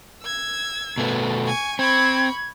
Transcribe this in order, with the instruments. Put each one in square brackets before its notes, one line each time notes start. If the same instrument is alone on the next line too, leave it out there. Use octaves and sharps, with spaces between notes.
[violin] E6 G#6
[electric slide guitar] B2 A3 B3
[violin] G#5 C#6
[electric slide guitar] C4 [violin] B5 C#6 [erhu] G#6